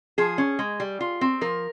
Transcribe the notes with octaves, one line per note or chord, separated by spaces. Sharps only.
F3 G#4
C#4
G#3
G3
F4
C4
F3 A#4